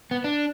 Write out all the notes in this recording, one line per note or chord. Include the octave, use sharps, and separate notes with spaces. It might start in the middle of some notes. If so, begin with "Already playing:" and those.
B3
D4